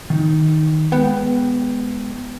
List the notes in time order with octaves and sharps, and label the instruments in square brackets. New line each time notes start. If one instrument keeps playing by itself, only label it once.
[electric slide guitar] D#3 D#4
[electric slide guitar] G#3 G5 [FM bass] B3